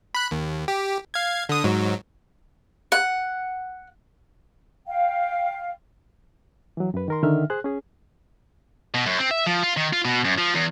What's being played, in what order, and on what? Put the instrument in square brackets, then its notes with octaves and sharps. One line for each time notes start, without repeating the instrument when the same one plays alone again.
[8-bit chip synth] B5 F#6
D#2
G4
F5 G#6
D3 D#6
G#2 F#3
[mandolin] F#5
[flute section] F5 G5
[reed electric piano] E3 F#3
F#2 B4
D#3 A#4 C6
D3 D#3 E5 F6
G#4 C5 F#6
C#4 G#4
[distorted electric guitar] B2
F#2
C4
E5
F3
F4
D#3
F4
B2
F#2
F3
E2